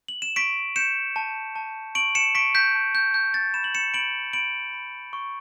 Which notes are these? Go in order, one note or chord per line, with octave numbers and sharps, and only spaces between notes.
F#7
E7
C#6 B6 D7
G6 C#7 E7
A5
A5
C#6 D7 F#7
C#7 E7
C#6 B6 D7
G6 B6
A5
G6
A5 G6
A6
B5 E7
F#7
C#7 E7
B5 D7 F#7
B5 D7 F#7
B5
C#6